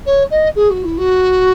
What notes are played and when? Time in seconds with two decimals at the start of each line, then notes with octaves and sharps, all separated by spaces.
0.05 C#5
0.30 D#5
0.55 G#4
0.70 F#4
0.83 E4
0.97 F#4